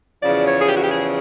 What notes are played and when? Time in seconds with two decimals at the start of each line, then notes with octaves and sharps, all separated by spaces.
0.23 E2 C#3 F3 D5
0.47 C#5
0.60 G#4
0.68 G4
0.77 F#4
0.84 G4
0.90 G#4